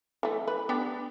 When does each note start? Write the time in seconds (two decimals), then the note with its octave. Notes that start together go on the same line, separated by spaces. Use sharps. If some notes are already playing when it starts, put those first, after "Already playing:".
0.23 E3 A3
0.48 B4
0.69 B3 D4 G4